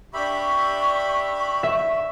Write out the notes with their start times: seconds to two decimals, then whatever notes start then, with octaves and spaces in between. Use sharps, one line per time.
0.14 D4 G4 E5 B5 C#6
1.63 E5